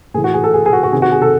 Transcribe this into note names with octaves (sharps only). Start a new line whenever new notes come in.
A2 E3 G#4
F#4
G#4
A4
G#4
G#4
F#4
F#4
C3 D#3 G#4
F#4
G#4
A4